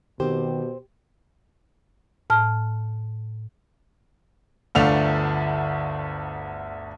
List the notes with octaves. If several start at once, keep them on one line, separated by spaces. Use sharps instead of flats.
B2 D#3 C4 G4 C5
A2 A5 F6
G1 D2 A3 D4 F5 F7